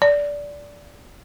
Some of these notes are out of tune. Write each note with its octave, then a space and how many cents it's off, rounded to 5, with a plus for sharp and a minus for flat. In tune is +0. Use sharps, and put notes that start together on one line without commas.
D5 -15